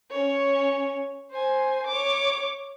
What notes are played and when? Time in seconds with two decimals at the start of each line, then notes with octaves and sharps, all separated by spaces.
0.11 C#4 C#5
1.31 C5 G#5
1.87 C#5 D6